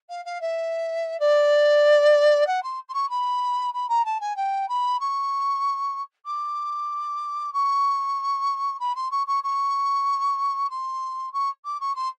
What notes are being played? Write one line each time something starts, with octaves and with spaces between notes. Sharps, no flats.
F5
F5
E5
D5
F#5
C6
C6
C#6
B5
B5
A#5
A5
G#5
G5
B5
C#6
D6
C#6
B5
C6
C#6
C#6
C#6
C6
C#6
D6
C#6
C6